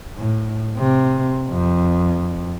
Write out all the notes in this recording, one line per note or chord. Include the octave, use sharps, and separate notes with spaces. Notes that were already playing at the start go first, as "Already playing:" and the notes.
A2
C3
F2